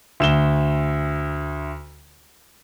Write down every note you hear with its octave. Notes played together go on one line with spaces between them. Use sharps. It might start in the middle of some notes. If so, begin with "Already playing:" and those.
D2 E7 G7